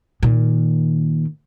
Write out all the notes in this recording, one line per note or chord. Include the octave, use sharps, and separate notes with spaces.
A#2 D#3